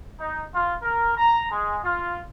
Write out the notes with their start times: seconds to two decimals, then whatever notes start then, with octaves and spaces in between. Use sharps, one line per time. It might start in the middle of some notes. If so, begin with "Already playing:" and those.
0.20 D#4
0.53 F4
0.82 A#4
1.17 A#5
1.51 G#3
1.84 F4